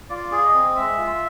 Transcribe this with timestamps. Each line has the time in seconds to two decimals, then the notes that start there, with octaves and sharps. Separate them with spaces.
0.10 F4 D5
0.32 G#4
0.43 D#5
0.54 C4
0.75 G#3 E5
0.98 F4